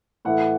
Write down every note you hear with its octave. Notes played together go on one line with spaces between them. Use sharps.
A2 E3 A3 F#5